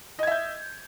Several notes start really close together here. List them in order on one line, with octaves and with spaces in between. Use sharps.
D#5 G#6 E5 G6